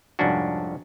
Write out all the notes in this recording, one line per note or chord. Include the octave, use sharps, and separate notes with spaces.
C2 F2 G#2 C#4 D4 F#4